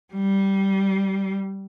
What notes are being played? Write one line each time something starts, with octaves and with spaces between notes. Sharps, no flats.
G3